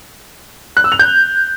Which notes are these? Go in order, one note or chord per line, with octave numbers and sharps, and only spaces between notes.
F#6
E6
F7
G6